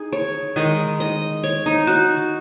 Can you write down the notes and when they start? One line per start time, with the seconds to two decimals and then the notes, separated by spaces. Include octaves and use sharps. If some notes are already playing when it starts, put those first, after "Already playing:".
Already playing: D#4 G#4
0.12 C#5
0.56 D#3 G#3 D#5
1.00 D#5
1.43 C#5
1.66 D#4
1.87 F#4